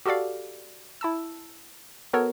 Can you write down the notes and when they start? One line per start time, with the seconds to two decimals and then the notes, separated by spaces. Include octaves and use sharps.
0.06 F#4 G4 A4 D5 F5
1.01 E4 A5 E6
2.13 B3 F#4 A4 A#4 C#5